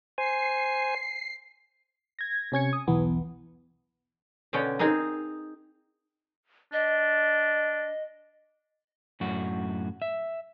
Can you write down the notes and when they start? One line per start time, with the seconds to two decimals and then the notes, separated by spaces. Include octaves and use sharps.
0.18 C5 G#5 C7
2.19 G#6 A#6
2.52 C3 C#4 G#6 C#7
2.73 D#6
2.88 B1 E2 E3 B3
4.53 B2 D3 C#4 G5
4.79 C4 D#4 G#4 A#4
6.73 D4 D#5
9.21 F#2 A2 F#4
10.02 E5